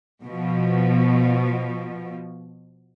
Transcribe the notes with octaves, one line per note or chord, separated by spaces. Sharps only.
B2 F3